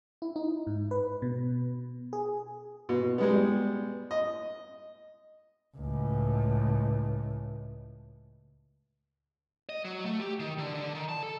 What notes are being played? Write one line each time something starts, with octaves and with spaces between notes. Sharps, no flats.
E4
D#4
G#2
B4
B2
G#4
B2
G3 G#3 B3
D#5
C#2 A2
D#5
F#3
A3
G4
D#3
D3
D3
D#3
A5
A4